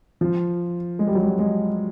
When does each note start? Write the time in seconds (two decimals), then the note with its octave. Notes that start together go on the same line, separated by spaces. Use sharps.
0.21 F3
0.99 G#3
1.08 G3
1.15 F#3
1.23 G3
1.39 G#3